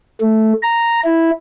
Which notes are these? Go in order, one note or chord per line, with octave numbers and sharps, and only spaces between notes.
A3
A#5
E4